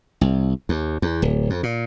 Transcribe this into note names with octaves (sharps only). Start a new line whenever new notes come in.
C2
D#2
E2
D1
F2
A#2